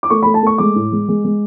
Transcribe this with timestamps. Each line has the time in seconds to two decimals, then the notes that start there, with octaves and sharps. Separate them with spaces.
0.03 D6
0.10 A3 C#6
0.23 A3 B5
0.34 A5
0.43 A3 C#6
0.58 G#3 D6
0.75 A2
0.92 G#3
1.08 G#3
1.24 G#3